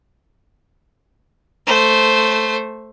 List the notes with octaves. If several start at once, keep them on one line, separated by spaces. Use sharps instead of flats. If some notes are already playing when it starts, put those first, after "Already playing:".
A3 C5